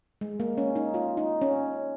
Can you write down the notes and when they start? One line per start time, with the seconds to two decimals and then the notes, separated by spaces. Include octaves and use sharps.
0.21 G#3
0.40 A#3
0.58 C#4
0.76 D#4
0.94 F4
1.17 D#4
1.41 C#4